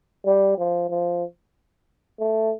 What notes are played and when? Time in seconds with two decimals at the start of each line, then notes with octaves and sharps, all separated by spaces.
0.26 G3
0.58 F3
0.90 F3
2.20 A3